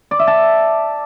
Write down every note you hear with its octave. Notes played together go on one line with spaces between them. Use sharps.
D5
E5
A5